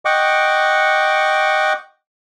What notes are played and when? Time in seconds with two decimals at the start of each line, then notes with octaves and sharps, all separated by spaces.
0.05 D#5 F#5 G5 C#6 D6